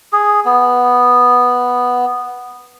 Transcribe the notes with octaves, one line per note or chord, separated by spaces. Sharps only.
G#4
B3